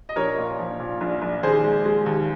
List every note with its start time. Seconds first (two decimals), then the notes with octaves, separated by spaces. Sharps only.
0.09 D#5
0.16 A#1 A#4 C#5
0.38 A#2
0.59 F3
0.79 A#2
1.01 A#1
1.22 A#1
1.43 D#2 G#4 C5
1.64 G#3
1.85 G#3
2.06 D#2